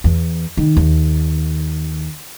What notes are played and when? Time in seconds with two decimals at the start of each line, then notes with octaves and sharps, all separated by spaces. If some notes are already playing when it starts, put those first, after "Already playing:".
0.04 E2
0.57 D#3
0.77 D#2